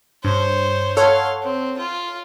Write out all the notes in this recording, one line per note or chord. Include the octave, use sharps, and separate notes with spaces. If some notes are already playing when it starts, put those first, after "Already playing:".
G2 C5 C#5
A4 C#5 F5 F#5 C6
C4
F4